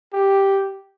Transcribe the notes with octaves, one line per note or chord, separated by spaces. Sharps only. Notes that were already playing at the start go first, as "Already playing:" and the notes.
G4